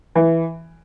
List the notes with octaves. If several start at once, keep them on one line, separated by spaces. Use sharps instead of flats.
E3